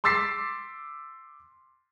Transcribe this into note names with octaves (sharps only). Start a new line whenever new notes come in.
C6 D6 E6 A6 B6 C7